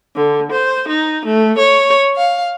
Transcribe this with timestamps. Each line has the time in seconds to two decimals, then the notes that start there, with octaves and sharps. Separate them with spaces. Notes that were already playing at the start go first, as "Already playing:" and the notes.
0.16 D3
0.52 C5
0.88 D#4
1.26 A3
1.59 C#5
2.16 F5